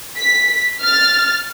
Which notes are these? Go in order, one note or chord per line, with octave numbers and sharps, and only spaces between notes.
B6
F6 A6